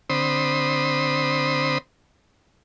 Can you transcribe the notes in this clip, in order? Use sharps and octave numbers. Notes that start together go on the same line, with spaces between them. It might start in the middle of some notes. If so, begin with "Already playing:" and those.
D3 C4 C5 B5 D#6